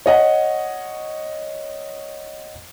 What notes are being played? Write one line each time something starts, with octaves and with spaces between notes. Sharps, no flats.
C#5 D#5 F#5